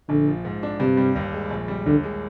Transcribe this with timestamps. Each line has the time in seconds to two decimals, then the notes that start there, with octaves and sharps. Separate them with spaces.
0.09 A#1 D3
0.27 F3
0.45 G#2
0.63 D4
0.80 G2 C3
0.97 G3
1.15 D#2
1.33 G#3
1.50 A#1
1.68 G3
1.86 D#2 D3
2.03 G#3